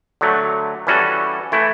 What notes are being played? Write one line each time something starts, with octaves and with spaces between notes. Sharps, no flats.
D3 F#3 A3
E3 G3 C#4 F#4 A4
E3 A3 E4